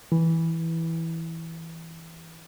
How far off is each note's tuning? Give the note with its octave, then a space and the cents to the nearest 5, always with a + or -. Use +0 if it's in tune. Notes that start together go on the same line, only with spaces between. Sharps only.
E3 -5